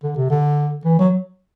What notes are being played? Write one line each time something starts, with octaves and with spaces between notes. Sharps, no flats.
D3
C3
D3
E3
F#3